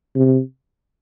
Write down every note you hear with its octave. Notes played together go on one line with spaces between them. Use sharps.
C3